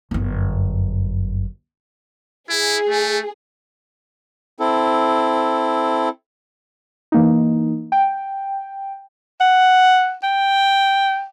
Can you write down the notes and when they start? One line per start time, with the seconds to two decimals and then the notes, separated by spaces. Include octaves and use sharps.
0.11 G1 F#2
2.50 E4 G#4
2.89 A3
4.60 C4 E4 A4
7.12 E3 A#3 D#4
7.92 G5
9.41 F#5
10.23 G5